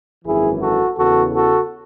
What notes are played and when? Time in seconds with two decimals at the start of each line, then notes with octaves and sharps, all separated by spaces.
0.25 G#1 F#2 E3 E4 G#4
0.62 F#4 A4
0.98 E2 C#3 E3 F#4 A4
1.35 F#4 A4